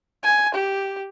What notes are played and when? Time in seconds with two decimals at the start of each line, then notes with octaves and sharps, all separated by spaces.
0.23 G#5
0.54 G4